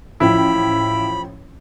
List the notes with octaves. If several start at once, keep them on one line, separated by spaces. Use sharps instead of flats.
A1 F3 E4 G5 B5